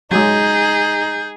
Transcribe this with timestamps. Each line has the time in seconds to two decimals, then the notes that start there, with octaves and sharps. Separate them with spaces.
0.11 F#3 G#3 D#4 G#4 G6